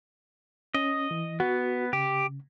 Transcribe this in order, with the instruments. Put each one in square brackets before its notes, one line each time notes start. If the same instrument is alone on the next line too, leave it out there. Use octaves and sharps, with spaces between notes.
[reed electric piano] C#4 [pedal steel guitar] D#5
[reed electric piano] E3
[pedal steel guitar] B3 [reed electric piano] F#4
[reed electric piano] C#3 [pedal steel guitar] G4